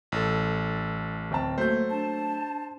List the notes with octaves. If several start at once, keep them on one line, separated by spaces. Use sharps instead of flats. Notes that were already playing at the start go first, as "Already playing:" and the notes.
A1 A4
D1 C4 A5
F#3 A3 A#3 C5 G6
D4 A5